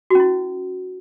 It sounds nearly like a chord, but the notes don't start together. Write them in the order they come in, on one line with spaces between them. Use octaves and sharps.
F#4 C#4 E4